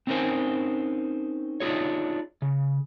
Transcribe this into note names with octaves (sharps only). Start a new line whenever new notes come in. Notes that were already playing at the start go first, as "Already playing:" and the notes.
C4 C#4 D#4 A#4 C5 G#5
D4 D#4 F4 G#4 C#5
C#3